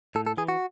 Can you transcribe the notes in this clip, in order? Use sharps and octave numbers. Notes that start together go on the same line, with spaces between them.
A2 A4
A4
E3 G#4
F#4